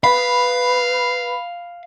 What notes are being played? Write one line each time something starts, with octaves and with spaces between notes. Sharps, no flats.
B4 F5 B5